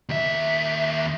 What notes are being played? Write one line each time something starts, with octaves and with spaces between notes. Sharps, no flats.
D#2 E5